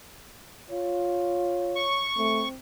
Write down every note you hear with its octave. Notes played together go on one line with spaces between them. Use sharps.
F4 C#5
C#6
A3 C4